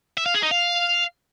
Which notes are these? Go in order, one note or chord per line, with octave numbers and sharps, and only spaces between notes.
E5
F5
G#4
D#4
F5